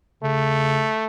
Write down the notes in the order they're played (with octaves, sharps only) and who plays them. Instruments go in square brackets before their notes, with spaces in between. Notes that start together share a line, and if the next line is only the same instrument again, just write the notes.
[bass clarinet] C#3 [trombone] A3